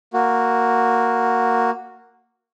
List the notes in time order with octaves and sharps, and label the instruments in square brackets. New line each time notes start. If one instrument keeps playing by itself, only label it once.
[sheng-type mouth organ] A#3 F#4